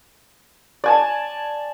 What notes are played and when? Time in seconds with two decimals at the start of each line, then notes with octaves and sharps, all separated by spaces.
0.84 D5 G#5 A5